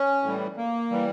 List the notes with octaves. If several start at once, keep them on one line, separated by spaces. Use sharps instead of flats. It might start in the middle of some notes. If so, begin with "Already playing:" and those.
Already playing: C#4
A2 E3 G3
A#3
E3 G3